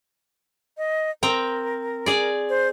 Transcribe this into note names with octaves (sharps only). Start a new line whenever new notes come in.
D#5
C4 A#4 G5 A#5
G#4 D5
C5